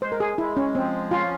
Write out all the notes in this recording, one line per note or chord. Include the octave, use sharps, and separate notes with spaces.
G#3 C5
A#4
G#4
G#3 E4
C#4
F3 C4
C#4 F4